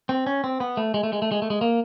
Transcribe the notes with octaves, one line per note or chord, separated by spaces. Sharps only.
C4
C#4
C4
B3
A3
G#3
A3
G#3
A3
G#3
A3
G#3
A#3